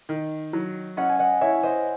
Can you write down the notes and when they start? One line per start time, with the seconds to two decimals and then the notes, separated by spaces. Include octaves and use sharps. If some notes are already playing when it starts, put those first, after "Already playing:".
0.09 D#3
0.53 F#3
0.97 C#4 D#5 F#5
1.09 G#5
1.19 D#5 F#5
1.41 E4 C#5 E5
1.63 C5 D#5